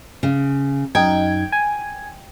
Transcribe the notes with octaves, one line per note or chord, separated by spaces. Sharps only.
C#3
F#2 D#4 G5 G#6
G#5